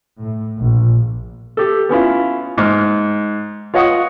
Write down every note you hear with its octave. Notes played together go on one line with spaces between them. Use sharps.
A2
A#1
G4 A4
B3 C#4 E4 F4
G#2 F6
F4 C#5 D#5 F#5 C#6 D#6